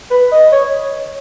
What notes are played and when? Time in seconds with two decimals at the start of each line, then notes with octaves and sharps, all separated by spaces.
0.11 B4
0.32 D#5
0.52 C#5